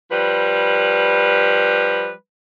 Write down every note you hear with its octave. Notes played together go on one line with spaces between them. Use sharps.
F3 G3 B4